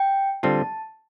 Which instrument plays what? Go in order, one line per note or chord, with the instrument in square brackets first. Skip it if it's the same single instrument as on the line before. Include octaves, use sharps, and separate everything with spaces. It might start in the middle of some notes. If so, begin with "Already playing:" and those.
Already playing: [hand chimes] G5
[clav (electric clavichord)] D3 G3 C4 F4 [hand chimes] A5